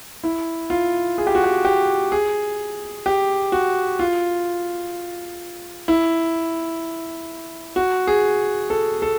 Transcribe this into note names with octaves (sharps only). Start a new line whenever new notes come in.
E4
F4
G#4
G4
F#4
G4
G4
G#4
G4
F#4
F4
E4
F#4
G#4
A4
A4